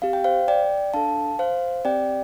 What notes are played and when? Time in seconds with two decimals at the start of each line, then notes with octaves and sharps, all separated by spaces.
0.02 C4 G4 F5
0.13 G5
0.24 C5 F5
0.48 D5 G5
0.93 D4 A4 F5 A5
1.39 C5 F5
1.85 C4 G4 D5 G5